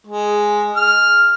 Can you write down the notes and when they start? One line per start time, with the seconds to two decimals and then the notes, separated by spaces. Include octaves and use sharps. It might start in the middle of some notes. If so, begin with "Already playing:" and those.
0.07 G#3
0.76 F6